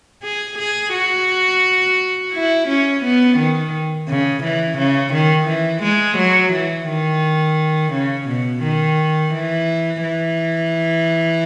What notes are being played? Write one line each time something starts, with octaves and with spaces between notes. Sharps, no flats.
G#4
G#4
F#4
E4
C#4
B3
D#3
C#3
E3
C#3
D#3
E3
G#3
F#3
E3
D#3
C#3
B2
D#3
E3
E3